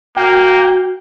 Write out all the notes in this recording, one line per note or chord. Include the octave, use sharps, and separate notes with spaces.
A#3 F#4 G5